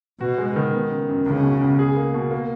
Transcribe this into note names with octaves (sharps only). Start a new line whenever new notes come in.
B2 F#4
G#3
D#3
B3
C#3
F#2
C#2 C#3
B2
C#2
G#4
A#3
B2
A#3